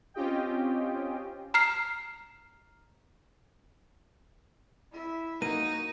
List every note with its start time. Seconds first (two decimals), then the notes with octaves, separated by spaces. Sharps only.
0.14 C4 C#4 F4 G4 D#5 G5
1.54 A#5 F6 C7
4.92 E4 E5
5.42 A#3 D#4 F#4 D#7